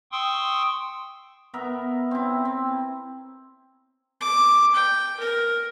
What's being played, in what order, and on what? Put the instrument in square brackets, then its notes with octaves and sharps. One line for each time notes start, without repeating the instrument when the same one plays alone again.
[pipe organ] G5 C6 C#6 D#6 E6
[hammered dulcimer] B3 A#4 E5 A#5
C4 E4
C4
[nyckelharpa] D6
G5
A#4